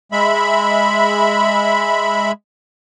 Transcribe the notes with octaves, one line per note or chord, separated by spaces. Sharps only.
G#3 E5 B5